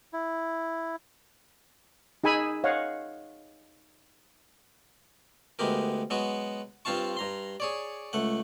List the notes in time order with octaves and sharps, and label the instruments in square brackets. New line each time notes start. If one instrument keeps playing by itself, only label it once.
[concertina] E4
[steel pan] D#4 G#4 G#5 B5 E6
C#5 D#5 F5 F#5
[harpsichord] D2 G#3 B3 G4 A#4
F#3 G#3 B3 F#4
G2 C4 F4 F5 A5 C#6
G2 A#5 C6
G#4 C#5 D5
C#2 A3 F#5